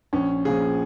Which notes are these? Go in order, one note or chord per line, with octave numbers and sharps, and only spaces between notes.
A#1 C#4
A#2 F3 G#4